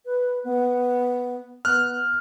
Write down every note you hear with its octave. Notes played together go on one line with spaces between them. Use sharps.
B4
B3
B3 F6 F#6